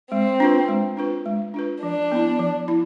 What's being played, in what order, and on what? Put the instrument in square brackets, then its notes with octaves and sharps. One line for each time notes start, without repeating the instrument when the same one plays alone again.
[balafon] G#3 [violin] C4
[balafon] D4 F4 B4
G#3
D4 F4 B4
G#3
D4 F4 B4
[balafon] F3 [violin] D4
[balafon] B3 E4
F3
E4